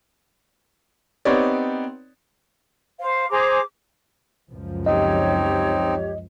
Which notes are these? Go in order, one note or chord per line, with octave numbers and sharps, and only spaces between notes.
B3 C4 D#4 G4 C#5 D5
C5 F5
G#4 C5 A#5 D6
C#2 F#2 F3
C4 D#4 G4 C#5 D#5